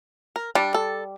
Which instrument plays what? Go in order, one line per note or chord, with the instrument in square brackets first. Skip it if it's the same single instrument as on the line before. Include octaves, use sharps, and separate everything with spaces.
[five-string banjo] A#4
[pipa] G3 [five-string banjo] D4
[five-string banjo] A4